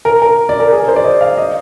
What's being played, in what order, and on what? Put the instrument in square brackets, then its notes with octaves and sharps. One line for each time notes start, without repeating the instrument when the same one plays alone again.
[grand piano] A#4
A#4
D5
A#4
G#4
A#4
C5
D5
D#5
F5
D#5